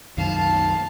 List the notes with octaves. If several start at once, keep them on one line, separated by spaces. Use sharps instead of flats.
C2 F#2 D#3 F5 A5